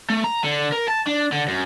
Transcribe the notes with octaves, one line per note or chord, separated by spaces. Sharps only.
A3
A#5
D3
A#4
A5
D4
D3
F#2